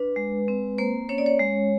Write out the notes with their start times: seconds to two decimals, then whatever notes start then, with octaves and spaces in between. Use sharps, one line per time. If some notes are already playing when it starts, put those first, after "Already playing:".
Already playing: D4 B4
0.16 G#3
0.48 C4
0.78 A#3 C5
1.09 C#4 C#5
1.18 D5
1.26 C#5
1.39 G#3